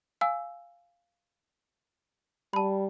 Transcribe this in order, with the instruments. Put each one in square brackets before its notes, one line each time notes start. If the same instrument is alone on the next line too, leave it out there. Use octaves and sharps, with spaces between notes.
[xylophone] F5 G#5 E6
[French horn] G3 [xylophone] A5 B5